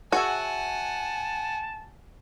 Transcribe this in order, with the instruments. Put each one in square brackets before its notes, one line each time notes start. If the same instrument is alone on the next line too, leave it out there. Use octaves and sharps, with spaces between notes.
[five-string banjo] F#4 [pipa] G#4 C#5 E5 [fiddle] F#5 G#5 [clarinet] A5